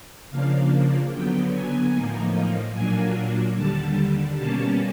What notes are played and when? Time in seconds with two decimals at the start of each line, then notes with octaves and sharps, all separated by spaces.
0.30 C#3 F3 A#3 D4 F5
1.12 D3 F#3 B3 G5
1.53 G#5
1.93 A2 F3 A#3 D#4
2.74 A#2 F#3 A#3 D4 G#5
3.56 D#2 D3 G3 A5
4.37 B2 G3 A#3 C#4 A5